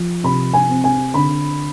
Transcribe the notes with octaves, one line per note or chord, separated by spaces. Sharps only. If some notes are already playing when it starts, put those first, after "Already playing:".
Already playing: F3
C3 B5
G#5
C4
G#5
D3 B5